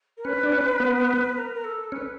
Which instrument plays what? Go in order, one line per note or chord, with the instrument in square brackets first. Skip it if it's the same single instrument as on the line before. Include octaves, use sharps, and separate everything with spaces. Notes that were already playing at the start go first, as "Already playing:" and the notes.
[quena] A#4
[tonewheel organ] C#4 [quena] B4
[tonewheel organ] D4
C#4
B3
[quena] A#4
A#4
A4
[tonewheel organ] C#4 [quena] B4